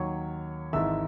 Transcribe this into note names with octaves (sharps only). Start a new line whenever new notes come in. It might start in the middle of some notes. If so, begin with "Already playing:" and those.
Already playing: D#2 D#3 F#3 C#5 C#6
G#1 G#2 E3 E5 E6